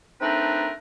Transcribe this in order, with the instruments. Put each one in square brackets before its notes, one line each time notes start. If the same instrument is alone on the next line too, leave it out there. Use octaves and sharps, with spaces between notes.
[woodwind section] A3 C4 D4 D#4 A#4 B4